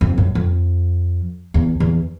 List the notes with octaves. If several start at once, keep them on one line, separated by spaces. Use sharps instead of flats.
F2
F#2
F2
E2
E2